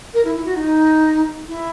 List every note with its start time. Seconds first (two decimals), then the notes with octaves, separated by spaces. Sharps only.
0.14 A#4
0.25 E4
0.35 E4
0.45 F#4
0.56 D#4
1.48 E4